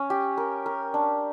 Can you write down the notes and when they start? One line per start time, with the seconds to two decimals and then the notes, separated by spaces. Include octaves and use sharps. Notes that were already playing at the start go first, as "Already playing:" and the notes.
Already playing: C#4
0.10 G4
0.37 A#4
0.66 A#4
0.94 D4